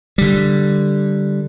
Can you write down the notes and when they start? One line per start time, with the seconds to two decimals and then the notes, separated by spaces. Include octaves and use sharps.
0.18 D3 G3